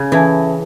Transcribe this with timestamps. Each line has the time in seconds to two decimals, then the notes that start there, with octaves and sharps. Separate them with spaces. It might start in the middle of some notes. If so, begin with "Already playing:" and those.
Already playing: C#3
0.12 E3 C#4 A4 E5 A5